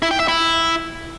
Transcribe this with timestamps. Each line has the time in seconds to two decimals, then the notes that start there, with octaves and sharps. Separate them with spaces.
0.02 E4
0.11 G5
0.20 E5
0.28 E4